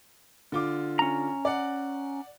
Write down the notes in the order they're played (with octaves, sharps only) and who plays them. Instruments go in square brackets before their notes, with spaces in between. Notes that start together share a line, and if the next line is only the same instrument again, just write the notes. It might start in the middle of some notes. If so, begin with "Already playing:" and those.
[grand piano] D3 F4 D6
[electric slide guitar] C#4 A#5
[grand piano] D5 F#5